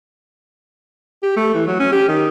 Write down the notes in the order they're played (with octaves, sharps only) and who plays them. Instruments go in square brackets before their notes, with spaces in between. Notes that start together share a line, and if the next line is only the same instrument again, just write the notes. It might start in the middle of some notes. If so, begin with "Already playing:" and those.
[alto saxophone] G4
A3
E3
F#3
C#4
G4
D#3